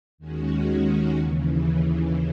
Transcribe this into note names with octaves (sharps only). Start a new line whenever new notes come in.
D#2 D#3 G#3 C#4 F#4
D#2 C#3 E3